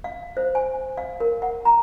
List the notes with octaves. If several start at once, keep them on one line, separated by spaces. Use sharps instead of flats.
F5
C5
G#5
F5
A#4
F#5
A#5